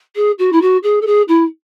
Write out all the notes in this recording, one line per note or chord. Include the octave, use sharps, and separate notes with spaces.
G#4
F#4
E4
F#4
G#4
A4
G#4
E4